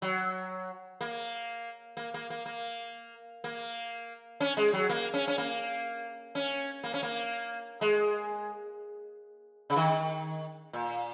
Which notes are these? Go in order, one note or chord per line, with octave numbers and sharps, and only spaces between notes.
F#3
A#3
A#3
A#3
A#3
A#3
A#3
C#4
G#3
F#3
A#3
C#4
C#4
A#3
C#4
A#3
C#4
A#3
G#3
C#3
D#3
A#2